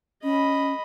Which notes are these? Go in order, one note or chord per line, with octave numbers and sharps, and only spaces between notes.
C#4 D#5 B5